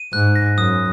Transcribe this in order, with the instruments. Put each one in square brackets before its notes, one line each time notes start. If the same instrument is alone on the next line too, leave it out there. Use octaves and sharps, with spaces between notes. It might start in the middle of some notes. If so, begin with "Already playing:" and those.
Already playing: [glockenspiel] D#7
[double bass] G#2 [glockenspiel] F#6
[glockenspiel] A#6
[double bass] F#2 [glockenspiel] D#6